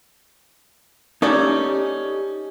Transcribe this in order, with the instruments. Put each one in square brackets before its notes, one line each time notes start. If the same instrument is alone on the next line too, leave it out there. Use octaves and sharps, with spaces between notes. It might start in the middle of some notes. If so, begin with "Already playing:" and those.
[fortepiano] C#4 [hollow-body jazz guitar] D#4 A4 D5 [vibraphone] G4